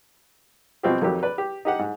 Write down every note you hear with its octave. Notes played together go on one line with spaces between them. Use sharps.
B2 F3 C4 F4 G4
F2 D#3 F#3 G4
B4 D5
G4
D#4 G4 F#5
G#2